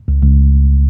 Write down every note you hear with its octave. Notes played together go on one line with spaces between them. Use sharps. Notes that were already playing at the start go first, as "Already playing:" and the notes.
C#2
C#2